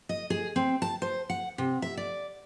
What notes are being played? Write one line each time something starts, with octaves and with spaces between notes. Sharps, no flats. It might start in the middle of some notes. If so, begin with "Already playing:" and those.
D#5
G#4
C4
A5
C5
F#5
C3
E5
D5